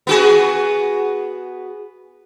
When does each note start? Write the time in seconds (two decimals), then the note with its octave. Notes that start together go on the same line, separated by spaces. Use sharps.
0.07 B3 F#4 G#4